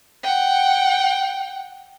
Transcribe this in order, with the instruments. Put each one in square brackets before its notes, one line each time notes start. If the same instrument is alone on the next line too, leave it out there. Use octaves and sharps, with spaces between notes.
[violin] F#5 G5